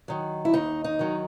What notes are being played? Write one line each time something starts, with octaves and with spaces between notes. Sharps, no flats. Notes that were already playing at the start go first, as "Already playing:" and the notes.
D#3 F#3
E4
D#2 D#4
D#4
D#3 F#3